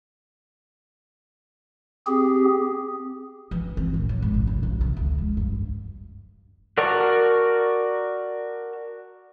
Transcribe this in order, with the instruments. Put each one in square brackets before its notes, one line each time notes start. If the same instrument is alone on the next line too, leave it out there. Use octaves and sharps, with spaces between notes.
[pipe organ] C4 G4 G#4
[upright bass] E3
C4
A#2
F#3
G#1
C#3
C3
B1
C3
D2
G#3
G2
[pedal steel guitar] F#4 A#4 D5 A5 C#6